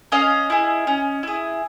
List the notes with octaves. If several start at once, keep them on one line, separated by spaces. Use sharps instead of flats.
C#4 D#5 F5
E4 G#4
C#4
E4 G#4